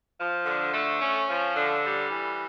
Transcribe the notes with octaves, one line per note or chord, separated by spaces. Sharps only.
F3
D3
A3
C#4
F3
D3
G3
E3